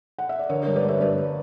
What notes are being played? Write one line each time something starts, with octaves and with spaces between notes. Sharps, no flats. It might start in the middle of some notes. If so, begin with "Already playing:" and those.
F#5
E5
D5
D3 A#4 C#5
A#4 C#5
G2
B4 D5
G2 C#5 E5
G2 B4 D5